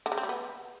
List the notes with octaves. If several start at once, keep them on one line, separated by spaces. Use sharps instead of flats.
D3
C#3
C4
G3
B3